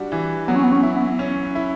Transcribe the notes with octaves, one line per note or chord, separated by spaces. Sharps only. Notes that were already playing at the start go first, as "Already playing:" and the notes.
Already playing: G3 D4 F#4
E3
F#3 B3
C#4
B3
C#4
E4
B3
C#4
E4